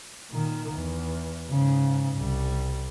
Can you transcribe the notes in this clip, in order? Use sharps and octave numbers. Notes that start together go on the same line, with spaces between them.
A#2 D#3
E2
G#2 C#3
C2 G3